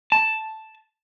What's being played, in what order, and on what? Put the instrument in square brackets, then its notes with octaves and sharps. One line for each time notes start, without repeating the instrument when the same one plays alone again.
[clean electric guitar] A5